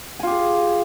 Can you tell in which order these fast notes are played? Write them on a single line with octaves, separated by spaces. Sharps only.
G#5 F4 G4 G#4